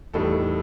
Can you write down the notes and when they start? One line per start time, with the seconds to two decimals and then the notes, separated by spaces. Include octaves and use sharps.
0.13 E2 A2 G3 D#4 A4